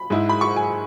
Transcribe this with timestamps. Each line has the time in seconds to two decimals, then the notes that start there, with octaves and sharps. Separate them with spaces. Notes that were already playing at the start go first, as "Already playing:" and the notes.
Already playing: B5
0.10 G#2 G#3 E4
0.29 B5
0.41 C#6
0.56 G#5